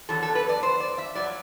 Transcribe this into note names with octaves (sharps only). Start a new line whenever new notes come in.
E2 D3 F#3 A4
A4
B4
D5
C5
D5
E5
G2 F#3 D5